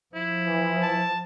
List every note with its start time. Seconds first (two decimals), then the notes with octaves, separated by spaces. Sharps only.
0.15 F3 E4
0.46 E3
0.82 A5